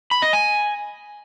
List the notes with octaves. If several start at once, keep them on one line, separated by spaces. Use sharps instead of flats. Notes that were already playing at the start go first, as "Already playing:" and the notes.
B5
D#5
G#5